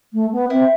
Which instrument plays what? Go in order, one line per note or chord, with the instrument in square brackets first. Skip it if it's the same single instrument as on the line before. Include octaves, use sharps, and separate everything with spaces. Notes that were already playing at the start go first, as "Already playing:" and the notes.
[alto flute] A3
B3
[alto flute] C4 [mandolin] E4